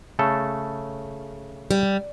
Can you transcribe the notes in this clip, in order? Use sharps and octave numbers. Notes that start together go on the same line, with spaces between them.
C#3 A3 A4
G3